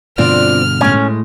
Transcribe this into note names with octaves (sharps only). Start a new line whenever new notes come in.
G2 B2 D3 C4 D4 F4 F6
A2 G#3 C#4